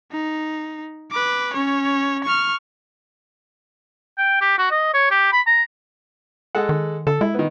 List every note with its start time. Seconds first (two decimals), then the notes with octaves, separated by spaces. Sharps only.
0.12 D#4
1.11 B4 D6
1.53 C#4 C#5
2.24 C#6 F6
4.18 G5
4.41 G4
4.58 F#4
4.71 D#5
4.94 C#5
5.11 G4
5.33 B5
5.47 A#5
6.55 G#3 A4 F#5
6.69 D#3
7.07 D3 A4
7.21 G#3 E4
7.35 D#3 B3